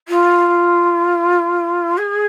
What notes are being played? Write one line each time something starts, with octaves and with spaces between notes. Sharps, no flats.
F4
G#4